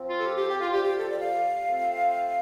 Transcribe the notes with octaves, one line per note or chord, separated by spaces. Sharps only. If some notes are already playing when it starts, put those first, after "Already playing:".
Already playing: F3 C4
F4
A4
G4
G4
G4
F4
C3 G3 F4 G4
G4
A4
D5
F5
C3 A3 C4 F4